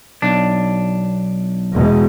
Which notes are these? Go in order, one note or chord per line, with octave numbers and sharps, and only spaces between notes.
B1 D4
E2 B2 G#3